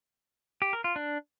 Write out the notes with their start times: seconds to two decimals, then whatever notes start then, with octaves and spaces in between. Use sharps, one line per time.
0.62 G4
0.73 A#4
0.84 F4
0.96 D4